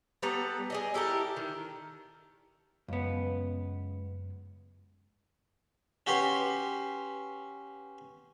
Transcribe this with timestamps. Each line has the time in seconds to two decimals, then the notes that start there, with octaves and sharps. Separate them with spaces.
0.22 G3 B3 A4 A#5
0.70 G#4 D5 D#5
0.94 E4 G4 A4 A#4
1.36 D#3
2.88 C#2 F#2 B3
6.07 C#4 F#4 G4 B4 C6